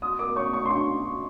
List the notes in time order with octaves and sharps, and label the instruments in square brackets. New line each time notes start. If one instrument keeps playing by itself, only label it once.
[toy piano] F#4 [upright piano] D#6
[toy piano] A#4 [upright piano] D6
[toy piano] C#5 [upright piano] C#6
[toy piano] C#5 [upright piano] C#6
[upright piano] C6
[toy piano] D4 [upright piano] C#6